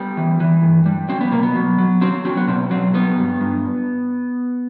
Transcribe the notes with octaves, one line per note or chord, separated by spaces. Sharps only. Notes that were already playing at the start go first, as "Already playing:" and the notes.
Already playing: G3 B3
E3
E3
G2
G3
F#3 C4
B3
B2 A#3
B3
F#3
F#3
F#3 C4
F#3 C4
B3
B2 C4
F#3 C4
G3 B3
G2
G2